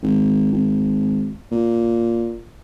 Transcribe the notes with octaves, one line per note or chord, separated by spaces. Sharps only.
G#1
G#1
A#2